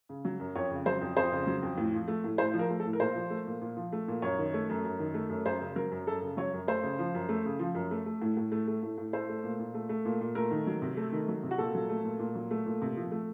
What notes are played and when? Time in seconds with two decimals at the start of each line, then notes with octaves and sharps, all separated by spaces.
0.09 C#3
0.25 F#3
0.40 F#2
0.56 F2 C#5
0.71 C#3
0.86 F#3 C5
1.01 F2
1.16 F2 C5
1.32 C#3
1.47 F#3
1.63 F2
1.78 A2
1.93 F3
2.08 A3
2.24 A2
2.38 A2 C5
2.54 F3
2.59 A#4
2.70 A3
2.80 A4
2.85 A2
2.93 A#4
3.00 A#2 C5
3.15 F3
3.30 A3
3.47 A#2
3.62 A#2
3.77 F3
3.93 A3
4.08 A#2
4.22 F#2 C#5
4.38 D#3
4.54 A3
4.69 F#2
4.85 F#2
4.99 D#3
5.14 A3
5.30 F#2
5.45 F#2 C5
5.61 C#3
5.76 F#3 A#4
5.92 F#2
6.07 F#2 A4
6.22 C#3
6.37 F#3 C#5
6.53 F#2
6.67 A3 C5
6.83 C#3
6.99 F3
7.15 F#2
7.29 A3
7.45 C#3
7.59 F3
7.75 F#2
7.91 A3
8.06 A3
8.22 A2
8.37 A2
8.52 A3
8.68 A3
8.83 A2
8.98 A2
9.13 A3 C5
9.29 A3
9.44 A#2
9.59 A#2
9.74 A3
9.89 A3
10.05 A#2
10.21 A#2
10.35 A3 A#4
10.51 D#3
10.67 F#3
10.82 C3
10.97 A3
11.12 D#3
11.28 F#3
11.43 C3
11.51 F#4
11.58 A#2 A4
11.74 F#3
11.89 A3
12.04 A#2
12.19 A#2
12.35 F#3
12.51 A3
12.66 A#2
12.81 C3
12.97 F3
13.11 A3